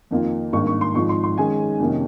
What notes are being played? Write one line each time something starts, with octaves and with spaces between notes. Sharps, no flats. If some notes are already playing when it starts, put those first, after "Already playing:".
F2 D#3 A#3 F4
G#1 G2 D#3 A#3 C#6
C#6
C6
G#1 G#2 F3 C#6
C6
C6
G#2 D#3 G#3 C#4 G#5
F2 C3 D#3 A#3 C#4